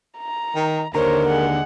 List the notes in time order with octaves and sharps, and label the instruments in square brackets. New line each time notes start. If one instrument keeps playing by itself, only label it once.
[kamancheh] A#5
[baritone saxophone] D#3
[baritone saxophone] D#2 [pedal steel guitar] D3 A#5 [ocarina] A#4 [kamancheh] C5 C#5
[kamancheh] G#3 F#5